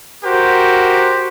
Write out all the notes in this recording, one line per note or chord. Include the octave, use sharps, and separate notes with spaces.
F#4 G4 A#4 C5